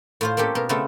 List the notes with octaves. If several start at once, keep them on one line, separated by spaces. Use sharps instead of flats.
A2 F4 C5
A#3 C4 C#4 G4 A4
B2 A#4
C#3 A3 B3 C4 E4 A4